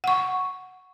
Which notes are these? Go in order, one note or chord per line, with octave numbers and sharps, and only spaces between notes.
F#5 C#6